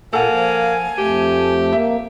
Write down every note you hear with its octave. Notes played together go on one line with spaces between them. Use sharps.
A#2 A#3 A4 F#5 G#5
F3
F2 A3 G4
A#3 E5